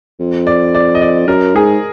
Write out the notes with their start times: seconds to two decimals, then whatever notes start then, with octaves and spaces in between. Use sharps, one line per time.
0.20 F2
0.47 D5
0.75 D5
0.95 D#5
1.02 D5
1.27 F#2 A#4
1.56 G#2 G#4